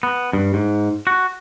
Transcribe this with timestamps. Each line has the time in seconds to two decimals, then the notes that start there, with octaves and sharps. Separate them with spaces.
0.03 B3
0.33 G2
0.54 G#2
1.07 F#4